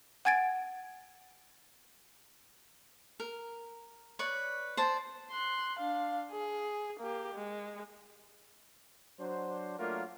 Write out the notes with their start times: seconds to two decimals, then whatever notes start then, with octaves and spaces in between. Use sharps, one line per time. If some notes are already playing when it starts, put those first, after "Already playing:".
0.25 F#5 G#5 G#6 A6 D7
3.20 A#4
4.19 B4 C#5 D5 C#6
4.77 C5 D5 A5
5.31 C6 F#6
5.79 D4 F5
6.31 G#4
7.00 A#3 G4
7.35 G#3
9.19 F#3 D4 C5
9.78 F#3 A3 A#3 D4 F4 A#4